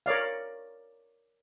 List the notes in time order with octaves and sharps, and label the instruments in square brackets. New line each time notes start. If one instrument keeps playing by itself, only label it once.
[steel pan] A#4 C#5 D5 F5